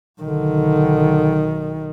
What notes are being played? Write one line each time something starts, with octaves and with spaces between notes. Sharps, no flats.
B1 D3 D#3